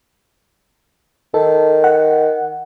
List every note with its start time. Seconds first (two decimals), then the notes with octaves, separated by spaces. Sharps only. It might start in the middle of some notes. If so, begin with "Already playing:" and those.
1.34 D#3 A4
1.84 F#5